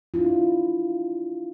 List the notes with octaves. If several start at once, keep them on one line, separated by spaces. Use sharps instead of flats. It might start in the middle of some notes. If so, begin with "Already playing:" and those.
D4 E4 F4